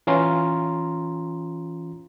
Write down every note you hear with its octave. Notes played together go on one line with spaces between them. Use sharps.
E3 C#4 F4 A#5 C6